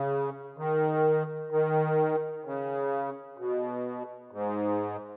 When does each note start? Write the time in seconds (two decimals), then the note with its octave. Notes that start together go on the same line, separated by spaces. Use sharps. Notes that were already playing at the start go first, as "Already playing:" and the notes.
Already playing: C#3
0.58 D#3
1.51 D#3
2.45 C#3
3.38 B2
4.31 G#2